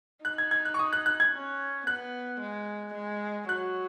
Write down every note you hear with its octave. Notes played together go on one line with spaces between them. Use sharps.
D#4 F#6
G#6
G#6
F#6
C#6
D#6
F#6
F#6
G#6
C#4
B3 F#6
G#3
G#3
F#3 F#6